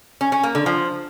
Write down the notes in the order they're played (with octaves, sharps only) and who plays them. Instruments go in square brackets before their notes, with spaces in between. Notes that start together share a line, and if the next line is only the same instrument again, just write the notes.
[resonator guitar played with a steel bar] C#4
C#4
A#3
D3
F3